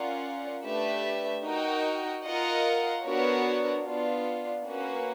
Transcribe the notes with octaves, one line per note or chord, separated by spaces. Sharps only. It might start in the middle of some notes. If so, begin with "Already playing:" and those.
Already playing: C#4 F4 A#4 D5 F#5
A3 D4 G4 B4 E5
D#4 F#4 A#4 D#5 G5
F4 A#4 D#5 F#5
B3 D4 F#4 A#4 C#5
B3 D4 F4
A#3 C#4 F#4 B4